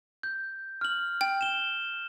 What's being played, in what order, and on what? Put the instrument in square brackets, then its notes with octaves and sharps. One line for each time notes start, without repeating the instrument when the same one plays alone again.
[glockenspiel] G6
F6 F#7
[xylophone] G5
[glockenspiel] E7 G7